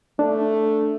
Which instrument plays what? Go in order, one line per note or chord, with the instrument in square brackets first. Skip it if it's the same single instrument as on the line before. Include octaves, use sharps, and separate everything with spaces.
[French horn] A3 [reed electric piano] D4